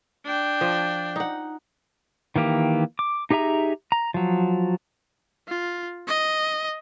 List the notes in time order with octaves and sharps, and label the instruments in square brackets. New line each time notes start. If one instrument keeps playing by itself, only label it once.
[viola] D4 G5
[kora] F3
D#4 F#5
[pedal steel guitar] D#3 E3 A#3 G4
D6
D#4 G4 G#4 E5 A#5
A#5
F3 F#3
[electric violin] F4
D#5